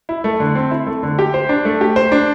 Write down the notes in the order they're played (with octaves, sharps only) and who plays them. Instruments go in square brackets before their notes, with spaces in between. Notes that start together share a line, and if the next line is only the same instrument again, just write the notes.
[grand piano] E4
A3
D3
C4
E4
A3
D3
G4
C5
D4
A3
G4
C5
D4